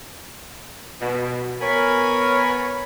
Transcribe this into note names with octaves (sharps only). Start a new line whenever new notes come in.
B2
B3 A#4 C#5 G#5 B5